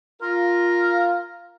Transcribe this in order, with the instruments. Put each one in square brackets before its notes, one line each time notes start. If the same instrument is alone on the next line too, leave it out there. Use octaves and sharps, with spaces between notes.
[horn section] F4 [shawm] A#4